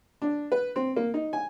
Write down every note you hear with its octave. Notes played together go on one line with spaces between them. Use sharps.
D4
B4
C4
A#3
D#4
G#5